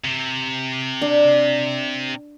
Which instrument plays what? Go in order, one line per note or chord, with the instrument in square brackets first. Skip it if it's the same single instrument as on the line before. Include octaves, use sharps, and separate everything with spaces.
[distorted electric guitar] C3
[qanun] D4